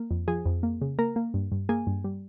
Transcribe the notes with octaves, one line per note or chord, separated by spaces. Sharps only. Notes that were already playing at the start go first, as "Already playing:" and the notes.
Already playing: A#3
F2
F3 G#4 G#5
F2
A#3
C#3
A#3 A#4 A#5
A#3
G2
G2
A#3 G#4 G#5
G2
G3